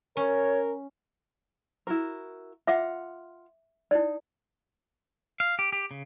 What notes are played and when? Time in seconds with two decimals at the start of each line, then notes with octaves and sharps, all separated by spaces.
0.17 C#4 A#4 C#5
1.87 E4 F#4 A#4
2.67 F4 E5 F#5 D6
3.91 D#4 E4 D5
5.40 F5
5.59 G4
5.72 G4
5.91 C#3